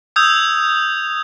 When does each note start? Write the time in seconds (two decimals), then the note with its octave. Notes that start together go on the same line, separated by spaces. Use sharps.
0.16 D#6 E6 G6 G#6 F7